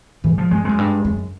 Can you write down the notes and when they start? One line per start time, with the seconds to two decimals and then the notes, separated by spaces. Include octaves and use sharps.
0.24 G#2 E3
0.38 F3
0.51 G2 G#3
0.65 F#2 G#3
0.78 G2
1.05 F#2